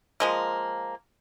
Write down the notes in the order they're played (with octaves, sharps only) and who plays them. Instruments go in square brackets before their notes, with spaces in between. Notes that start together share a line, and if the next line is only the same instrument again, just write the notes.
[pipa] F3 G#3 A#3